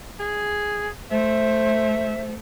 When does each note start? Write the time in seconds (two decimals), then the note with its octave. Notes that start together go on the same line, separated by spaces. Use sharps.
0.20 G#4
1.11 A3 C5 E5